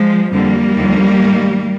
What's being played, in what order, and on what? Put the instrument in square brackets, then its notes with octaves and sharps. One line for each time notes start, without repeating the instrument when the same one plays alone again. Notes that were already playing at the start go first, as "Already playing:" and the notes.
Already playing: [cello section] F3 G#3
F2 D3 F3 G3 A#3
D#2 D3 F3
G#2 D#3